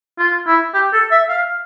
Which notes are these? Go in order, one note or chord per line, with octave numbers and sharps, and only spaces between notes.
F4
E4
G4
A4
E5
F5